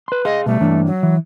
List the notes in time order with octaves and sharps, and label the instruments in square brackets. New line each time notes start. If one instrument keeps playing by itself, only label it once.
[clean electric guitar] B4 C6
[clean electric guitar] G#4 F5 C6 [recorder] D#5
[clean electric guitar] B2 G3 [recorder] A3
[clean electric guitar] G2 E3 D4
[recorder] F#3
[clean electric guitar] E3